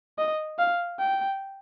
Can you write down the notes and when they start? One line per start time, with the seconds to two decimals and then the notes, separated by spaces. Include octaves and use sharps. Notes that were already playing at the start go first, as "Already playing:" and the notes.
0.18 D#5
0.59 F5
1.00 G5